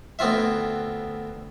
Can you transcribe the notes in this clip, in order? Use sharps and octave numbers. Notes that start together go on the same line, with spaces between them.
D2 B3 C4 F4 E5